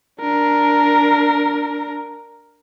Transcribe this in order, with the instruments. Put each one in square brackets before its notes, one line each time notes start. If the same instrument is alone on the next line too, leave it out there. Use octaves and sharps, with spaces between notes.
[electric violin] D4 A#4